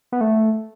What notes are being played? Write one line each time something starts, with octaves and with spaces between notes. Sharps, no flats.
B3
A3